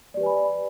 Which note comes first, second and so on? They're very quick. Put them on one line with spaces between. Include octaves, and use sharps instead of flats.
D5 G4 B4 G#5 B5